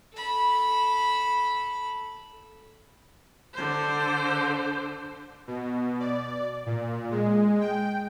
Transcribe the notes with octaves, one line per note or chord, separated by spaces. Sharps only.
A4 B5
D3 C5
B2
D5
A#2
G#3
G5